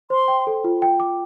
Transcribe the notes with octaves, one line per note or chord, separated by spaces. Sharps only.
C5 C6
G5
A4
F4
G5
D6